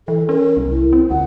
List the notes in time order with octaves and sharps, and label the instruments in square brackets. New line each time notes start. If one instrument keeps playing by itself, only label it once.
[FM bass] E3 [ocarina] A4
[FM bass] C#4 [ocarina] A#4
[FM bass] C2
[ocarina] E4
[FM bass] C4
[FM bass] D2 [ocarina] F#5